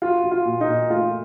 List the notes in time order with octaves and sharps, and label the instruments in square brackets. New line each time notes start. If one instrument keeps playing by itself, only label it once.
[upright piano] F4 [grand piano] F#4
[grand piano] F#4
[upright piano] F4
[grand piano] A#2
[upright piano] D#4
[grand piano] A#2
[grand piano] A3 [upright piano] F4